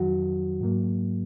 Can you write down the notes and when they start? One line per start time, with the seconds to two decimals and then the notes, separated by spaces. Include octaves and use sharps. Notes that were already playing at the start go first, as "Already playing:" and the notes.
Already playing: F2 D#3 F#3 F#4
0.61 G#2 F#3 A#3